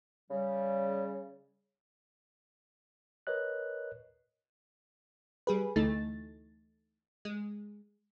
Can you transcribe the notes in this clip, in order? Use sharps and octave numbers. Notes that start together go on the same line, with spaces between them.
C#3 G3
A#4 B4 C#5 D#5 F#6
G3 G#4 B4
D2 E3 A3 D#4 A6
G#3